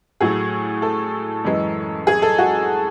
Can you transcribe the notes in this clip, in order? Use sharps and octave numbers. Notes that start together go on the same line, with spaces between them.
A2 F#3 A3 G#4
A4
F#2 E3 G#3
G#4
A4
F#4